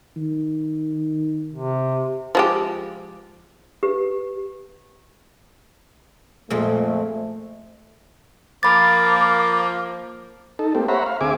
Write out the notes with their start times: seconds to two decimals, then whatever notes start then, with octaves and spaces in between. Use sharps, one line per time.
0.16 D#3
1.53 C3
2.35 F3 G#3 G4
3.83 G4 B4
6.50 F2 A#2 G#3 A3
8.63 F3 A#3 B5 D6 A6
10.59 D#4 A4
10.75 A3 A#3 C4 G4
10.88 C5 C#5 E5 F#5 A#5 B5
11.06 F5
11.21 D2 C4 G#4 E5 G#5 D6